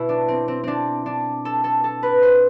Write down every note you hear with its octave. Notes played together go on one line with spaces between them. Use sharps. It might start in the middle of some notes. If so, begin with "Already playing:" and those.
Already playing: B2 E4
D4
C4
C4
C4 D4
D4
A4
A4
A4
B4
C5